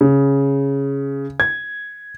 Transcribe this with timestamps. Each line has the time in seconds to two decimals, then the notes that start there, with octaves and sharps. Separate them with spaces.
0.01 C#3
1.40 G#6